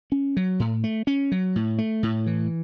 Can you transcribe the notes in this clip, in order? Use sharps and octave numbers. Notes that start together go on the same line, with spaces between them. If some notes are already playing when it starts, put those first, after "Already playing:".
C#4
F#3
A2
A3
C#4
F#3
A2
A3
A2
E3